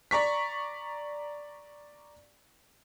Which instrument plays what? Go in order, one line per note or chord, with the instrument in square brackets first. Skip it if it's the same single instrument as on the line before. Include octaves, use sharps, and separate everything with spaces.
[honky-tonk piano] D5 A#5 C#6 B6